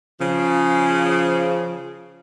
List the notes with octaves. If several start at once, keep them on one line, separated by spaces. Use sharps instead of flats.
C#3 F3